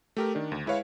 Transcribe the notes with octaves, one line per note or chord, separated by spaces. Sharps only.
A3 G4 A#4
D#3 D4
D2
G#3 E4 B4 C#5 F5